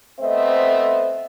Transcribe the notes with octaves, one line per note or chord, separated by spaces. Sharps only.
A3 B3 C4 C5 D#5 E5